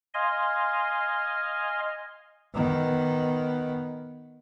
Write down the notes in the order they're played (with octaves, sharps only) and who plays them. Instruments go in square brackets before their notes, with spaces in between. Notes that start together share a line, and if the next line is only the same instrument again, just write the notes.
[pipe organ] D#5 F5 G#5 C6
[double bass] D#3 B3